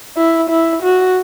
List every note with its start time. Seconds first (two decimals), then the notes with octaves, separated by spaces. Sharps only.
0.17 E4
0.50 E4
0.83 F#4